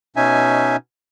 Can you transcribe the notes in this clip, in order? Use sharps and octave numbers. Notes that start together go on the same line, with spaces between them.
B2 C#4 D#4 E5 G#5